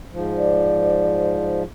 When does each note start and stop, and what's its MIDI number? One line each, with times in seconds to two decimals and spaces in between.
0.12 1.63 44
0.12 1.63 53
0.37 1.62 74